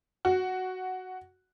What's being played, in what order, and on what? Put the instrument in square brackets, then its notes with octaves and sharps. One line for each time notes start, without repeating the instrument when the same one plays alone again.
[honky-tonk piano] F#4